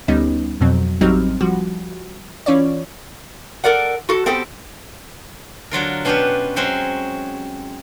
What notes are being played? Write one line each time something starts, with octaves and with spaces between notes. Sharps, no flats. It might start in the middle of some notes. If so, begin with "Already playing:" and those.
D2 G3 B3 C#4 D#4
F2 B2 F#3 C4
A1 F#3 G3 C4 D#4 F6
F3 G3 F#4
E3 C#4 F4 C#5 D5
A4 A#4 D5 F#5
F#4 A4
B3 C4 G4 A4
D3 F#3 F4 A#4
B2 C#4 D4 F4 G4 B4
F#3 G#3 C4 C#4 F#4